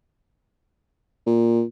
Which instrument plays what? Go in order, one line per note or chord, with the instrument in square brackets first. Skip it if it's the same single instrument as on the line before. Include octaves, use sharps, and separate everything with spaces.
[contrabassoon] A#2